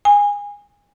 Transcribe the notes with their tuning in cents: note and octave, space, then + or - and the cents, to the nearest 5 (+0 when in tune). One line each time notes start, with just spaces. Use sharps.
G#5 -25